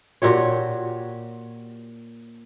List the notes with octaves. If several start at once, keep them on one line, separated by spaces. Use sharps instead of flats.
A#2 F#4 G4 C#5